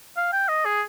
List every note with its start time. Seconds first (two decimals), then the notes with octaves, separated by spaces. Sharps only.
0.17 F5
0.33 G5
0.49 D#5
0.65 G#4